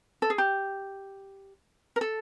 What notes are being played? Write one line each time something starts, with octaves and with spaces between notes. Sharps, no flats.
A4
G#4
G4
A#4
A4